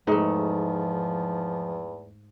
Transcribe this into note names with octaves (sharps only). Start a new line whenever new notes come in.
E2 G#2 F3 A3 D#4